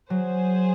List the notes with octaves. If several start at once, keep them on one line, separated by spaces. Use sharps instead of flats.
F#3 G#4 C5